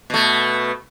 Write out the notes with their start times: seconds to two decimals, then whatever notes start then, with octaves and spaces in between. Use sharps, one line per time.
0.10 B2 A3